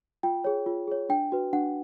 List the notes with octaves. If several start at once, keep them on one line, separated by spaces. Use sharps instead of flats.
F4 G5
G#4 C#5
F4
G#4 C#5
D4 G5
F#4 B4
D4 F#5